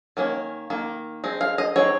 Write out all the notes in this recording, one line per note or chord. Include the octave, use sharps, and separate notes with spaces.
D#3 A#3 C#4
D#3 A#3
G#3 C4
F5
D#5
G#3 C4 D#4 C#5